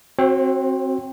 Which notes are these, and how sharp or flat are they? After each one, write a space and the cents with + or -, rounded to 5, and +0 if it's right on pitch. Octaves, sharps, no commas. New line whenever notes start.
C4 +15 F#4 +0 C#5 -45